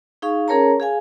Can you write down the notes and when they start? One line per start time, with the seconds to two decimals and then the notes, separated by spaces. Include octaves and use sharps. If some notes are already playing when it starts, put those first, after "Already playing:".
0.22 D#4 G#4 F5 C#6
0.48 C#4 G#4 A#4 C#5 A5 A#5
0.80 G#4 F5 G#5